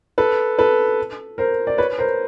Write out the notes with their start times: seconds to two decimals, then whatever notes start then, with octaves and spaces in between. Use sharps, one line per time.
0.18 A4 B4
0.59 A4 B4
1.38 A#4 C5
1.67 D5
1.78 B4 C#5
1.98 A#4 C5